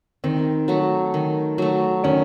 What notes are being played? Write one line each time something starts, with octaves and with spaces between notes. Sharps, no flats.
D#3 C4
F#3 A3
D#3
F#3 A3
D#3 C#4